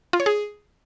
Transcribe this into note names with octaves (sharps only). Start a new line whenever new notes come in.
F4
C#5
G#4